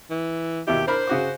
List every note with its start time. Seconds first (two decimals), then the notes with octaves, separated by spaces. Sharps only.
0.10 E3
0.67 D#2 B2 E4 G4
0.87 D4 A#4 C5 B5
1.07 C#3 F#4 D6